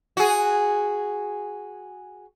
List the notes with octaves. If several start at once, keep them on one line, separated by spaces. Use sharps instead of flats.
F#4 G#4